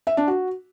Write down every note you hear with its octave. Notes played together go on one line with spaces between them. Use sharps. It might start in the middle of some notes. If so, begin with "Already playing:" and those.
E5
D4
F#4